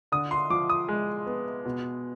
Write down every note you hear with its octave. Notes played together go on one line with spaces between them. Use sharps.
D3 D#6
C6
F3 D6
D#6
G#3
B3
B2